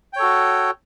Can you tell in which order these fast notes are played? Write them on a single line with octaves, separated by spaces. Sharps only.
G5 C#5 A4 F#4